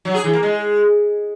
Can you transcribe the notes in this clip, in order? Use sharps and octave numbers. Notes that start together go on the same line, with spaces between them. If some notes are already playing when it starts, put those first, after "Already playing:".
F#3
G#4
E3
A#3
G#3